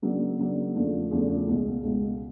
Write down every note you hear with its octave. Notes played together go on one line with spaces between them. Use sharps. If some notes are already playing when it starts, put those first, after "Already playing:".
C#3 F#3 A#3 D4
C#3 F#3 A#3 D4
E2 C#3 F3 A3 D4
E2 C#3 F3 A3 D4
C#2 B2 G#3
C#2 B2 G#3